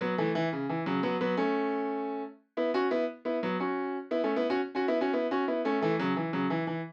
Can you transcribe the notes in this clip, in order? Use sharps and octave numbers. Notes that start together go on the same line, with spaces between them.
F#3 B3
E3 A3
E3
C#3
E3
C#3 F#3
F#3 B3
F#3 B3
A3 C#4
B3 E4
C#4 F#4
B3 E4
B3 E4
F#3 B3
C#4 F#4
B3 E4
A3 C#4
B3 E4
C#4 F#4
C#4 F#4
B3 E4
C#4 F#4
B3 E4
C#4 F#4
B3 E4
A3 C#4
E3 A3
C#3 F#3
E3
C#3 F#3
E3
E3